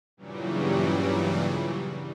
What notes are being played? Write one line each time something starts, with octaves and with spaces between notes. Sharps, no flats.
G2 A#2 C#3 E3 F#3 G3